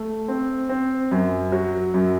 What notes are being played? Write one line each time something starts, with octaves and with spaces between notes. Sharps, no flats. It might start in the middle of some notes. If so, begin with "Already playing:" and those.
Already playing: A3
C4
C4
F#2
F#3
F#2